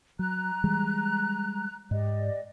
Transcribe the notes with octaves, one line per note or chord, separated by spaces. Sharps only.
F#3 A#5 F#6
E3 G3 G#3
G#2 G4 D5 D#5